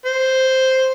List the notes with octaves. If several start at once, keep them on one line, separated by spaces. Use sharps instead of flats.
C5